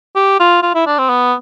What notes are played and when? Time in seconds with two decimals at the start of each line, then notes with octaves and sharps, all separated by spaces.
0.16 G4
0.40 F4
0.63 F4
0.75 E4
0.86 D4
0.99 C4
1.09 B3